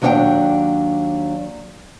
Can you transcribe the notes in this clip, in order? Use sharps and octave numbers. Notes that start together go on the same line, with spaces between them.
D#2 F#3 D4 D5 F#5 G5